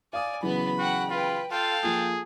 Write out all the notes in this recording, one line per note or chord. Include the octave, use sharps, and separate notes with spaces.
D5 F5 G#5 D#6
C#3 E3 F#3 B3 B5
F#4 F#5 G5
F4 B4 G5
F4 A4 F5 G5
F3 A#3 F4 G#4